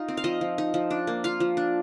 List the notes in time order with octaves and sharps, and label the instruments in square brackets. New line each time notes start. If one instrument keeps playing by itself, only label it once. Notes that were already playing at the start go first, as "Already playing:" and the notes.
Already playing: [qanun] D#4 F4
C4
F5
F3 D#5
F3
D#4
F3
D4
A#3
F4 F5
F3
D4